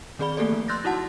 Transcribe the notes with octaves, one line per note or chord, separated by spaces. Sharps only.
D#3 C4 G#4 D5 B5 G7
A3 A#3 G4 A4 D5
F3
C6 E6 F#6 G6 A6 A#6
D#4 E4 F#4 F#5 A5